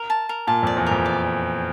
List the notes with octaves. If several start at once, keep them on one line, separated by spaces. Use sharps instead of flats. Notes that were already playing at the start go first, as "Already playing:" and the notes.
Already playing: A#4
A5
A#4
A#2 A5
F2
D5
E2
F2 A#4
D5